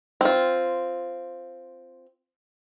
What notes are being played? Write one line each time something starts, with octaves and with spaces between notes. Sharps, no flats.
C4 F4